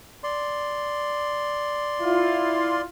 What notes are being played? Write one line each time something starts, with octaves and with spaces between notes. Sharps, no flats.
D5 C6
E4 F4